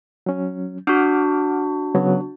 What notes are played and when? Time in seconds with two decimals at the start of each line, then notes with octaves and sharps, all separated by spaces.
0.26 F#3 C#4
0.87 D4 F#4 F#5 D6 F6
1.95 C#3 F#3 B3